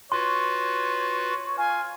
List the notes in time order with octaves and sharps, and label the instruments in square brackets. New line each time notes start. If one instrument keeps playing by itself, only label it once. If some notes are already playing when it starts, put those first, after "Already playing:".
[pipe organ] F4 F#4 B4 [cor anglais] C#5 [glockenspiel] C6
[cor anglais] F4 [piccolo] G#5